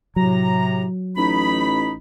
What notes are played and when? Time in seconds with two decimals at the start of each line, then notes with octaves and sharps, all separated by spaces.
0.16 A2 C3 F#3 A#5
1.16 A1 D#4 B5